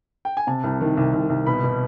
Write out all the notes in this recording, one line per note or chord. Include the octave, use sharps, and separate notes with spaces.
G5
G#5
C3 A5
C2
D#3
C2
C2
C2
B2 B5
B2